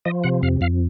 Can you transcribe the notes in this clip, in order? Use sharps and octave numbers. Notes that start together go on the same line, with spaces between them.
F3 D#5
C3 F#5
F2 F5
F2 F5